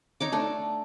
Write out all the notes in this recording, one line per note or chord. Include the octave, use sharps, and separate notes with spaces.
D#4 C#5 D6
A3 D4